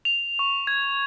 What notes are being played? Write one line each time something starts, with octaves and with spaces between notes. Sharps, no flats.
F7
C#6
G#6